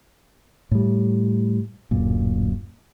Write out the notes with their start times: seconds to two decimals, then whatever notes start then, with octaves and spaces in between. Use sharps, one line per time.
0.71 A2 G3
1.91 D1 F#2 A#2